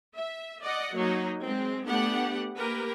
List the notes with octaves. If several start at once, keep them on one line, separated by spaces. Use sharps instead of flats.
E5
D5 D#5 F#5
F#3 A#3 D#4
G#3 C4
A3 B3 D4 G4 F#5
A#3 G4 A#4 B4